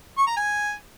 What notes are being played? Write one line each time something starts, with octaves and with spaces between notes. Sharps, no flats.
C#6
A#5
G#5